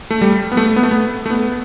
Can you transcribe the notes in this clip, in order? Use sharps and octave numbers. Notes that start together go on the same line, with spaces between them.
A3
G3
B3
A3
B3
A3
B3
A3
B3